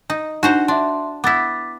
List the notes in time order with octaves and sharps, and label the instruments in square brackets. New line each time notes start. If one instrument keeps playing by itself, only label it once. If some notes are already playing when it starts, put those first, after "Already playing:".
[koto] D#4
[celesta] D4 D#4 [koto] F#4 C5 A#5
[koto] D4 [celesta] E5 C6
[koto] B3 E4 [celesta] D6 A6 B6